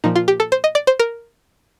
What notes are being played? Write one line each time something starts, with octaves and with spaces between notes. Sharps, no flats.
A#2 F3 D#4
F4
G4
A4
C5
D#5
D5
C5
A#4